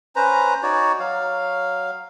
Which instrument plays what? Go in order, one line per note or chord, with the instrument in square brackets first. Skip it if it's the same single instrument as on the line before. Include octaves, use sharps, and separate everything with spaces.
[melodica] C#4 B4 C5 A#5
D#4 F#4 C#5 D5
F#3 F5